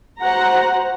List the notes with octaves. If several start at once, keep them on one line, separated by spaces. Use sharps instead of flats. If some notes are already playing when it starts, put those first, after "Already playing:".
F#4 C5 F#5 A#5